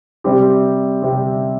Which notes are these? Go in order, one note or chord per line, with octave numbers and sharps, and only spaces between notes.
C3 G3 C4 G4
C3 G3 C4 G4